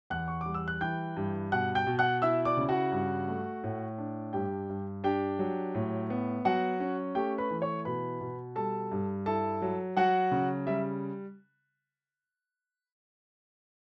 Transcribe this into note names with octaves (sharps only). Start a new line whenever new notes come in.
E2 F#5 F#6
C#6
G3 D6
E6
F#6
E3 G5 G6
G2
B2 F#5 F#6
G5 G6
B2
F#5 F#6
E4 E5 E6
D5 D6
C#3
F#4 F#5
G2
A3
A2
D4
G2 G4 G5
G2
D4 G4 G5
F#3
A2
B3
F#3 F#4 F#5
C#4
A3 G4 G5
B4 B5
E3
C#5 C#6
B2 B4 B5
B2
G3 A4 A5
G2
E4 A4 A5
F#3
F#3 F#4 F#5
C#3
G3 E5